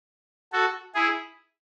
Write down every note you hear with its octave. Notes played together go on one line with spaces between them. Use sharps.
F#4 A4
E4 G#4